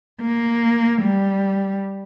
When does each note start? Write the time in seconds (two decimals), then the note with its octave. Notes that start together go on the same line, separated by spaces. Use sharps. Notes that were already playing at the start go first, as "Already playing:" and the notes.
0.21 A#3
1.02 G3